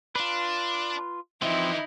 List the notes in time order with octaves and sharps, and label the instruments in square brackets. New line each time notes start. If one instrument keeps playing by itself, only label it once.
[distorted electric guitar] D4 [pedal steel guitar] F4 B4
[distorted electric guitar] D3 E3 [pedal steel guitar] F3 C4 [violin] D#4 E4